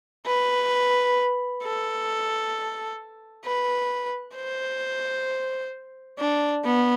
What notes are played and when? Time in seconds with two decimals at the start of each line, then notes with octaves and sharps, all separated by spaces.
0.26 B4
1.63 A4
3.45 B4
4.36 C5
6.19 D4
6.65 B3